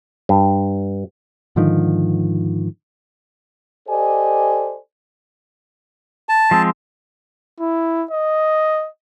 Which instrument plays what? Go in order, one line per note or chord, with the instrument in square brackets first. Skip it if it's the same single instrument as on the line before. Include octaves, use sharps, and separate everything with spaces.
[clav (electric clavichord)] G2
[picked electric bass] G#2 D3 D#3 F3
[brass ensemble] G4 A4 C5 D5 D#5 G#5
[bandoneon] A5
[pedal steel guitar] F3 G#3 C4
[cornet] E4
D#5